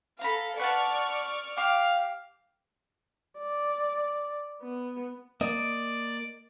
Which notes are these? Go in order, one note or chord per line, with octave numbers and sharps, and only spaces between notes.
A4 F5 A#5 B5
B4 D5 F#5 A5 C#6 F6
G4 F5 D6
D5
B3
A#3 D5 D#5